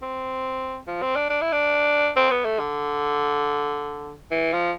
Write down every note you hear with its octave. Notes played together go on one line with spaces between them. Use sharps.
C4
F3
C4
D4
D4
E4
D4
C4
B3
A3
D3
E3
F3